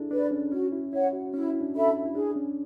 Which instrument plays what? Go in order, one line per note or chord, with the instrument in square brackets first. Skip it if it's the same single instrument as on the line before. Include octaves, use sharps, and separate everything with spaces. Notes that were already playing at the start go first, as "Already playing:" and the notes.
Already playing: [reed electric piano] D4 E4 G#4 A4
[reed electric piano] D4 [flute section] B4 D5
[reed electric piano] C#4
[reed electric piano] C#4 [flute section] F#4
[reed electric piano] E4
[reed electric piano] E4 [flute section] C#5 F#5
[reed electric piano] F#4
[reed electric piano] C#4 [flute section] E4
[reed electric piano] E4
D4
[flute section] A4 E5 B5
[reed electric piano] E4
E4
[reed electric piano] D4 [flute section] G#4
[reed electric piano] C#4